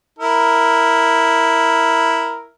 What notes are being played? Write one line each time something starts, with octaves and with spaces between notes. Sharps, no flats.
E4 A#4